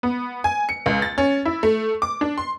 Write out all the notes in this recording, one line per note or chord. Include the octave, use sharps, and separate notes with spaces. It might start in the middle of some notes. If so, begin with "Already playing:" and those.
B3
G#5
C#7
C#2
A6
C#4
E4
A3
D6
D4
C6